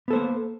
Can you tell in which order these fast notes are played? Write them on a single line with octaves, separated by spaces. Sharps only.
B3 A4 C5 A#3